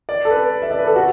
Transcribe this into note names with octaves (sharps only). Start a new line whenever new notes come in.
D5
A4
B4
E5
D5
B4
A4
F#4